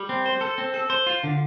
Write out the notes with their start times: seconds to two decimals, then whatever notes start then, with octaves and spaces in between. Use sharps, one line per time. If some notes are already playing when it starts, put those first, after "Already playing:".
Already playing: G3
0.09 C4
0.26 C5
0.41 A4
0.58 C4
0.74 A4
0.90 C5
1.07 F4
1.24 D3